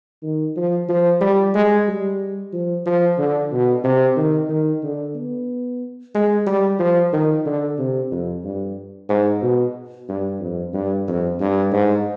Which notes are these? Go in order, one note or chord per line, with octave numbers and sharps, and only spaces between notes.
D#3
F3
F3
G3
G#3
G3
F3
F3
D3
B2
C3
D#3
D#3
D3
B3
G#3
G3
F3
D#3
D3
C3
F2
G2
G#2
B2
G2
F2
G2
F2
G2
G#2